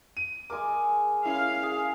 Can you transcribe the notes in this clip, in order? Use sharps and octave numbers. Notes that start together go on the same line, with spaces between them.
D#7
G#3 A#4 G#5 D6
C#4 E4 F5
G#4